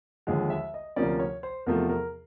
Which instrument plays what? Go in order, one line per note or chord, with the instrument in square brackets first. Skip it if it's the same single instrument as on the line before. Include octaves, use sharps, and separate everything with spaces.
[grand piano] D#2 D3 F3 G#3 F#5
E5
D#5
D2 C3 F3 A#3 C#4 D5
C#5
C5
E2 C3 F3 A3 A#4
A#4